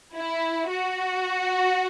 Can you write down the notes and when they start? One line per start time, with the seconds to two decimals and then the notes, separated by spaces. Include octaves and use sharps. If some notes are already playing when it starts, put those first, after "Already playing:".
0.16 E4
0.70 F#4